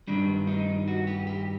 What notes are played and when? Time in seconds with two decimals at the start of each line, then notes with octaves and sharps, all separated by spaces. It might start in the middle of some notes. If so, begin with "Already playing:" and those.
0.07 G2 D#3 G3 D4
0.47 D#4
0.88 F#4
1.07 G4
1.27 G4